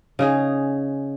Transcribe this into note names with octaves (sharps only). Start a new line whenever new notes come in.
C#3 D#4 G#4